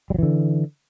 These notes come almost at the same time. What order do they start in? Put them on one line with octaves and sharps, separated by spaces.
G3 F#3 E3 D3